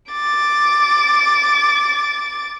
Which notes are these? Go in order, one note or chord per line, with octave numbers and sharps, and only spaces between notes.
D6 A6